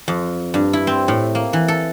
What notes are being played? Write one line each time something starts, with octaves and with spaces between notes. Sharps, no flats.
F2
G2
E4
C4
A2
A#3
E3
A4